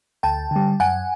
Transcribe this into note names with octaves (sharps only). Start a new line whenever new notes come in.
D2 G5 A5
D3 G3
F#2 F#5 G#5